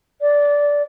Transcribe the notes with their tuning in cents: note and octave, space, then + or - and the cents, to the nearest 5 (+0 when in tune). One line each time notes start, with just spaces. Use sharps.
D5 -15